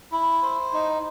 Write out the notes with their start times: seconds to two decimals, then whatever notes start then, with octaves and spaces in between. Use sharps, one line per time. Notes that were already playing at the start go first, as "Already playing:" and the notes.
0.12 E4
0.43 C5
0.73 D#4